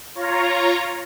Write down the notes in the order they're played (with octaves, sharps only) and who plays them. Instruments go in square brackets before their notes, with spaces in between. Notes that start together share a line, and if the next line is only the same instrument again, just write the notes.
[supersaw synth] F4 C#5 A#5